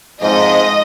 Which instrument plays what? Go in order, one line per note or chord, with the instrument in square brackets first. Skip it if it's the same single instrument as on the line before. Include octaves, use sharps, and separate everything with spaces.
[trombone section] F2 G#2 F3 [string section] D#5